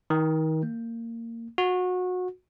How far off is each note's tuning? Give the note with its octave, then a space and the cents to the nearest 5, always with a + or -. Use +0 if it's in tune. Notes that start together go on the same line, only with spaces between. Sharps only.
D#3 +30
A#3 -20
F#4 -25